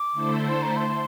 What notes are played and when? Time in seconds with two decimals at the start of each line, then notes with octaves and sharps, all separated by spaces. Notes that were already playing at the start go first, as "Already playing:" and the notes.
Already playing: D6
0.12 D3 A3 E4 A4 C5
0.50 C6
0.62 A#5
0.77 C6